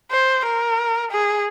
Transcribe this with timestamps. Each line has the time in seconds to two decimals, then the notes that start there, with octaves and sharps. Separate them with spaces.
0.11 C5
0.46 A#4
1.11 G#4